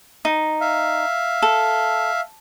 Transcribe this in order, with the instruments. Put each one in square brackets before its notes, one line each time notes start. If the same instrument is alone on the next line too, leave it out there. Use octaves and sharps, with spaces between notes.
[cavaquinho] D#4
[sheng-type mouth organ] E5 F5
[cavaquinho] A4